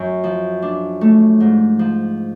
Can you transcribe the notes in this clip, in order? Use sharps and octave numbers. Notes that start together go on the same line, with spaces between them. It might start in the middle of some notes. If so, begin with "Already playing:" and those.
Already playing: F#2
F3
D4
A3
G#2
F3